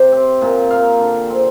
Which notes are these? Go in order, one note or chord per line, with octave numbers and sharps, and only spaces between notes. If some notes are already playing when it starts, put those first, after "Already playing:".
Already playing: C3 G4
C4
A#2
A#3 F5
D3
C4